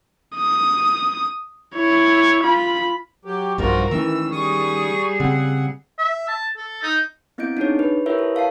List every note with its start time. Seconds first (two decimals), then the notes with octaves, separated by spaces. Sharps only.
0.37 D#6
1.75 E4 C#5
2.43 F4 B5
3.25 F#3 G4
3.58 B1 G2 F3 G3 F4 F#4 A#4
3.91 D#3 E3 A3 C#4 E6
4.32 G3 G#4 C#6 D#6
5.20 C#3 C4 F#5
5.99 E5
6.28 A5
6.57 A4
6.83 D#4
7.38 B3 C4 E4 D#5 G6 D7
7.57 D4 D#4 G#4 C#5
7.79 B4
8.06 E4 G4 A#4 B4 C#5 E5
8.19 A4
8.35 C#5 F5 A5 C7